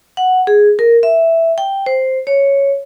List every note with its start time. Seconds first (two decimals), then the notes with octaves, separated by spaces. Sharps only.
0.17 F#5
0.47 G#4
0.79 A#4
1.03 E5
1.58 G5
1.86 C5
2.27 C#5